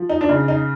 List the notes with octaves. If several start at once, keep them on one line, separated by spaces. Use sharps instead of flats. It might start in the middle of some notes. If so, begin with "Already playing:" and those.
Already playing: F3
D#4
D4
C#3 D#4
D#4